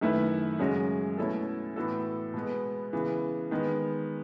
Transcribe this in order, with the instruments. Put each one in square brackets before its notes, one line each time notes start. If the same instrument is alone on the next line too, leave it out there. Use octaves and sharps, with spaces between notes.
[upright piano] F#2 D#3 A3 E4 B4
F#2 C#3 G#3 C#4 F#4
B2 A3 C#4 E4 A4
A2 E3 B3 F#4 A4
B2 G#3 B3
C#3 E3 B3
D#3 G#3 B3